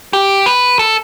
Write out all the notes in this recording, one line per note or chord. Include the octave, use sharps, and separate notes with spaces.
G4
B4
A4